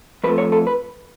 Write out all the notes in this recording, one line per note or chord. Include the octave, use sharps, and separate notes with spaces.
F2 F3 A3 B4
C#5
A4
B4